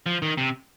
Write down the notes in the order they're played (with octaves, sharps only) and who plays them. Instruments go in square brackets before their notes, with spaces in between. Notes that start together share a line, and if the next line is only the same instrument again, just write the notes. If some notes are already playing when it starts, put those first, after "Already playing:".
[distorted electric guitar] F3
D#3
C3